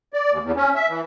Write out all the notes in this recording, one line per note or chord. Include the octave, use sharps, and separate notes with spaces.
D5
D#2
E2
C#4
E5
E3